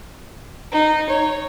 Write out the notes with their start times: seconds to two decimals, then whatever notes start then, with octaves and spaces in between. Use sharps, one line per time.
0.71 D#4
1.09 C#5